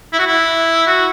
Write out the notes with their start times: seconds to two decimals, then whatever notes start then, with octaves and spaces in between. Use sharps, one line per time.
0.13 E4
0.19 F#4
0.26 E4
0.87 F#4